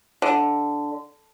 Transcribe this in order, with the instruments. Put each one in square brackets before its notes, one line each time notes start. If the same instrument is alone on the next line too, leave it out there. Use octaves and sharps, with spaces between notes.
[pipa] D3